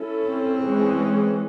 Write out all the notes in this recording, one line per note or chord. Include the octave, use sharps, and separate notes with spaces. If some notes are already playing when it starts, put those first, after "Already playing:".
Already playing: C#4 E4 A4
C4
E3 G#3 C#4